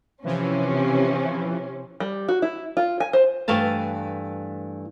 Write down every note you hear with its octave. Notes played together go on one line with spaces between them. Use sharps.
C3 E3 F3 C#4
G3
F#4
E4
F4
G#5
C5
G2 E3 A3 F5 A5